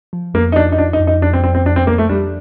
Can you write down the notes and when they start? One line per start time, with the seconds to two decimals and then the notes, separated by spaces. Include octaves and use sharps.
0.13 F3
0.34 F2 A#3
0.52 D#4
0.56 F3 D4
0.72 D#4
0.78 F3 D4
0.93 D#4
1.00 F2
1.07 D#4
1.22 F2 D4
1.33 C4
1.44 F2 C4
1.55 C4
1.65 F2 D4
1.76 C4
1.87 F2 A#3
1.98 A3
2.09 G3 D4